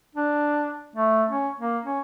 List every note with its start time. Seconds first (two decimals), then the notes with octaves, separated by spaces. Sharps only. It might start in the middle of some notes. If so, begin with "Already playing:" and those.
0.15 D4
0.95 A3
1.29 C#4
1.60 A#3
1.85 C#4